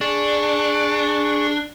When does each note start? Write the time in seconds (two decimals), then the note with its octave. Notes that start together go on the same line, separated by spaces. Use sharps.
0.01 D4 G#4 C#6